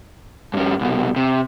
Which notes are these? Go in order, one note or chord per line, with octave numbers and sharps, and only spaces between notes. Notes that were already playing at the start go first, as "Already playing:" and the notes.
G2 C#4
C2 B2
C3